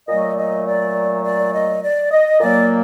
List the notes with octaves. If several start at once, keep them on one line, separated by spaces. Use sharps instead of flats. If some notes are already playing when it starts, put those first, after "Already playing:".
A#2 F#3 A3 D#5
D5
D#5
D5
D5
D#5
D5
D#5
A#2 F#3 A#3 D5